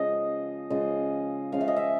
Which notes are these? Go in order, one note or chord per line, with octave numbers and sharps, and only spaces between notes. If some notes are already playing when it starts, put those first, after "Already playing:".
Already playing: C#3 F3 G#3 D#5
C#3 F3 G#3 D#5
C#3 F3 G#3 F5
E5
D#5
E5